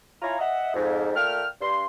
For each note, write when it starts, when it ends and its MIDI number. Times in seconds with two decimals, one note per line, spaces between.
0.22 0.37 64
0.22 0.37 65
0.22 0.37 73
0.22 0.37 77
0.22 0.37 80
0.22 0.37 82
0.40 0.73 75
0.40 0.73 76
0.40 0.73 78
0.74 1.11 41
0.74 1.11 44
1.15 1.44 46
1.15 1.44 57
1.15 1.44 79
1.15 1.44 89
1.61 1.86 43
1.61 1.86 84